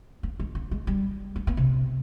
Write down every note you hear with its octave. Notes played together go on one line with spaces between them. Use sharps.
B3
G#3
B3
G#3
G3
B3
B3
C3